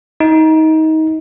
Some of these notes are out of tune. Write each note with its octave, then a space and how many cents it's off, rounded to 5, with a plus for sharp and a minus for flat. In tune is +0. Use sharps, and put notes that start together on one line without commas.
D#4 +25